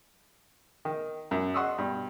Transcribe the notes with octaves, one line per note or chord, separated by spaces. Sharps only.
D#3
F#2
D#5 F#5 C6 C#6 D#6 E6
G2 B2